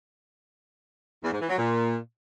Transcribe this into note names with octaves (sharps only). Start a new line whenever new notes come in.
E2
G#2
E3
F#3
A#2